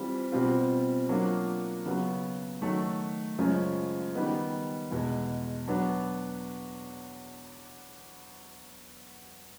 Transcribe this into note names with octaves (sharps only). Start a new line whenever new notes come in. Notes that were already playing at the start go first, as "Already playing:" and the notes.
Already playing: E3 G3 C4 F4
B2 G3 C4 F4
F#3 A#3 D4 F4
C#3 F#3 B3
D#3 F#3 A3
F#2 C#3 F3 G#3 C#4
D#3 G3 B3 D#4
E2 B2 G#3
F#3 B3 D4